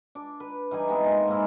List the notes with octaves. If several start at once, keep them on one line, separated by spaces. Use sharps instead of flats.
D4 D6
B4
E3 G3 D#4 G#5
G#3 B3 C4 D#4
A#2 F4
G#2 G#3 A#3 E4